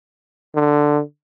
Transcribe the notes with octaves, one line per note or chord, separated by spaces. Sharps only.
D3